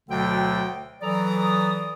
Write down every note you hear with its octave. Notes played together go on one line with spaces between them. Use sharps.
D2 B2 D3 F#3 G5
E3 F#3 A4 D5 A#5 D#6